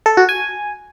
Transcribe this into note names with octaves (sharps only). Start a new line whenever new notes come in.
A4
F#4
G#5